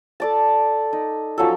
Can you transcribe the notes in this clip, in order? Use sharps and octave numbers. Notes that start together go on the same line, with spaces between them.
A4 D5 A5
D#4
F3 F#3 C#4 A4